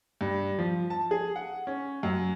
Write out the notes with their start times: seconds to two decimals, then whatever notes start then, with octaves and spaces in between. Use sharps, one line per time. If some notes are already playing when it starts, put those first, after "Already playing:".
0.21 G2
0.59 F3
0.90 A5
1.11 G#4
1.36 F#5
1.67 C#4
2.03 F#2